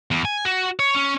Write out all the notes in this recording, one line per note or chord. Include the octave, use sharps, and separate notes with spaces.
E2
G#5
F#4
C#5
C#4